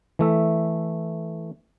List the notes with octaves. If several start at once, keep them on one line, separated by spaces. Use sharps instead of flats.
E3 A3 E5